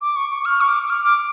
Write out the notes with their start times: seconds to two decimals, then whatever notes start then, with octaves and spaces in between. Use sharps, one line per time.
0.01 D6
0.16 C#6
0.30 C#6
0.45 F6
0.61 C#6
0.68 D6
0.83 D6
0.90 F6
1.04 D6